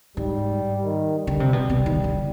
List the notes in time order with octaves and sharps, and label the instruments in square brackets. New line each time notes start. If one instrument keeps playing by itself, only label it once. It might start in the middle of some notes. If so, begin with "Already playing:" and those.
[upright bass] G#2 [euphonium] G3
[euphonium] D#3
G3
[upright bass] D3
C3
B2
B2
D#3
D3